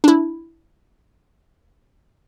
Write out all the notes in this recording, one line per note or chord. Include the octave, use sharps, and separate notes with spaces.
D4 E4